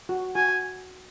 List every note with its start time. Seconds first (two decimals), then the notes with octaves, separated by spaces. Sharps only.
0.09 F#4
0.35 F#4 G#5